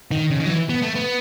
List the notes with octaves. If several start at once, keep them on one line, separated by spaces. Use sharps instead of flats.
D#3
C#3
D#3
F#3
E3
B3
A3
B3